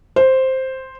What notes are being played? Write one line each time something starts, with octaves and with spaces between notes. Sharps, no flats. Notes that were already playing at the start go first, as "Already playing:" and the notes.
C5